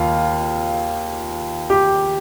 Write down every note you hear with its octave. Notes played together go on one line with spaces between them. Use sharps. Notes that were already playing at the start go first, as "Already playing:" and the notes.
Already playing: D#2 F4
G4